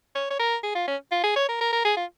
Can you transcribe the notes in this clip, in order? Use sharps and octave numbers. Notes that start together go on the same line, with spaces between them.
C#5
C#5
A#4
G#4
F4
C#4
F4
G#4
C#5
A#4
A#4
A#4
G#4
F4